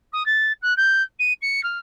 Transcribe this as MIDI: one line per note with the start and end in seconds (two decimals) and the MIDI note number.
0.12 0.25 87
0.26 0.52 93
0.62 0.73 90
0.77 1.02 91
1.19 1.33 99
1.41 1.63 97
1.63 1.78 89